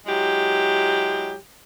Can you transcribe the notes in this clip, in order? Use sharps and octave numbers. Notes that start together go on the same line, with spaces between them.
F#3 G#3 E4 G4